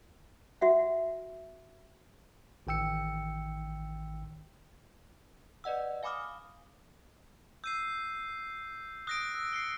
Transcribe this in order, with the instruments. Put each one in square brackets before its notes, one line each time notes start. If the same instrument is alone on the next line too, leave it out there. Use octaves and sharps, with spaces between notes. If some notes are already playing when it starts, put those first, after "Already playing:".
[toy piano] F#4 E5 F#5
[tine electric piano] A1 D#3 G5 E6 C#7
[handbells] B4 D5 D#5 F#5 E6
F5 G#5 B5 D6 D#6 F6
[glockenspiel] E6 D#7 [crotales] G6 C7
[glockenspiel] D#6 [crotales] F#6 A#6 D7
[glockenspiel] E6
C7 C#7 G7